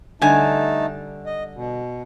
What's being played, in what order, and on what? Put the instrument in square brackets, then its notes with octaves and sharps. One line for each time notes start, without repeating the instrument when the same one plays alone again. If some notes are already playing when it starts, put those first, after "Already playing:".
[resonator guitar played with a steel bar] D3 G3 G#5 [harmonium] A3 D#4 A5
[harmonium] D#5
B2